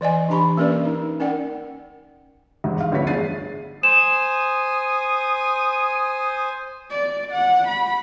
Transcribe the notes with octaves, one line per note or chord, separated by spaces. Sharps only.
E3 D5 D#5 G#5
E3 D4 G4 A#5 B5 C#6
A#3 C#4 A#4 B4 D5
D#4
C#4 A#4 D5 F#5 G5
G#1 E2 G2
F5
G1 D2 F3 E4 C#5 B6
A1 D4 G#4 A6 C7 D#7
C5 G#5 D#6 E7
D5
F#5
B5